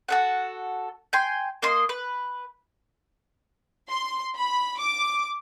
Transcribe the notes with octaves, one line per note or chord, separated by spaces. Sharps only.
F#4 A4 F#5
G5 G#5 C6
A#3 D#5 C6
B4
C6
B5
D6